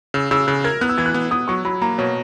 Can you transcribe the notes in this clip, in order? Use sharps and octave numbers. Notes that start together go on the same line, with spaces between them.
C#3 E6
C#3 E6
C#3 F#6
A#4 G#6
B3 F#6
E6
E3 G#6
F#6
B3
B3 D#6
F#3 C#6
F#3 B5
A#3 A#5
B2 C#5